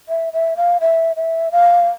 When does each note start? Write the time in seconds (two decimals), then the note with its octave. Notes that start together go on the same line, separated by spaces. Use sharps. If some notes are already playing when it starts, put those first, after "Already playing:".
0.09 E5
0.33 E5
0.57 F5
0.81 E5
1.16 E5
1.52 F5